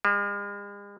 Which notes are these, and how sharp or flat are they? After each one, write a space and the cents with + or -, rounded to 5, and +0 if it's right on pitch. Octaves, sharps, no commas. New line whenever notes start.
G#3 -45